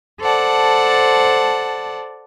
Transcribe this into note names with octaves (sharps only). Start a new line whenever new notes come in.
A4 C5 D5 F#5 A5